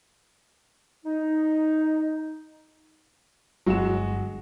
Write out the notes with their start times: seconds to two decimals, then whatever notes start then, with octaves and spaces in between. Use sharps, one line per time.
1.05 D#4
3.66 G1 F#3 G#3 F#4 F#5 E7